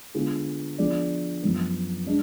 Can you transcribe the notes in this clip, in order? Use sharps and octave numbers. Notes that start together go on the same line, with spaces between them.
D3 G#3 B3 F4 G#4
F3 B3 D4 G#4 D5
F#2 F3 B3
G#3 D4